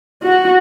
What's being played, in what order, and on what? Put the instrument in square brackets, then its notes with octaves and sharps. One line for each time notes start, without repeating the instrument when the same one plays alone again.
[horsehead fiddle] F#4